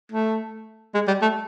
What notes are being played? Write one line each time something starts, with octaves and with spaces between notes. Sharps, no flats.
A3
G#3
G3
A3